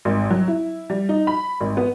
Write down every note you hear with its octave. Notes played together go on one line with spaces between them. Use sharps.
G#1
F#3
E4
G3
D#4
B5
G#1
B3